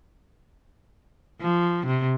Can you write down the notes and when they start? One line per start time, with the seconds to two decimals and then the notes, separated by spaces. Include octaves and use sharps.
1.41 F3
1.86 C3